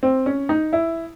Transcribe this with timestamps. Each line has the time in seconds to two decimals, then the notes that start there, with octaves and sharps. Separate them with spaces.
0.03 C4
0.26 C#4
0.49 D#4
0.73 E4